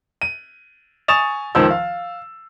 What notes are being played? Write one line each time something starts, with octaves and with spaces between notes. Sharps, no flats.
D#7
G#5 C#6 D#6 A6 E7 F7
C#2 D#3 F3 C5 E6
F5